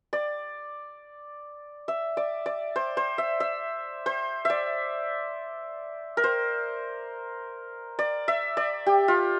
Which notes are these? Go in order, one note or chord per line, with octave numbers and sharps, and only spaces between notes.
D5
E5
D5
D5
C5
C5
E5
E5
C5
D5 E5
A#4
C5
D5
E5
D5
G4
F4